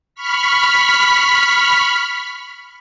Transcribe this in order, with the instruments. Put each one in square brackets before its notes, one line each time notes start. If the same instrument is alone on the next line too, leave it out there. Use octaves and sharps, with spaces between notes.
[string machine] B5 C#6 F6 B6